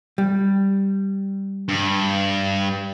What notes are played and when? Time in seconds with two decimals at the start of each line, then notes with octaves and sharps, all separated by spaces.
0.18 G3
1.68 G2